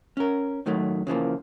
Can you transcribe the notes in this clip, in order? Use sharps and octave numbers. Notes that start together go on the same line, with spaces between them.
C#4 A#4
A2 D#3 F#3 A3
C#3 E3 F3 A#3